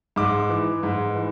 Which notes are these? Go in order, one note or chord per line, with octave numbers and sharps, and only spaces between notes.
G#2 D6
E3
G#2
E3